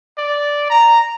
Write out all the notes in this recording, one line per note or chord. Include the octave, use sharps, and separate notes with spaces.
D5
A#5